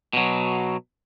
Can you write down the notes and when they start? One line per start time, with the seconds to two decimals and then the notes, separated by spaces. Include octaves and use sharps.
0.13 B2 F#3